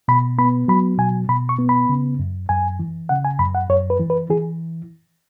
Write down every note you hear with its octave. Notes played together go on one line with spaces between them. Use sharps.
B2 B5
B3 B5
F#3 B5
B2 G#5
B2 B5
C#6
B3
B5
C#3
F#2
F#2 G#5
E3
C#3 F#5
G#5
F#2 B5
F#5
F#2 C#5
B4
E3
B4
E3 G#4